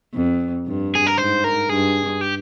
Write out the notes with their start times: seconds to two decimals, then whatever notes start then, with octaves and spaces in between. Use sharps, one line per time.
0.14 F2
0.66 G2
0.95 G#4
1.07 A#4
1.17 G#2 C5
1.44 A#4
1.69 G2 G#4
2.21 G4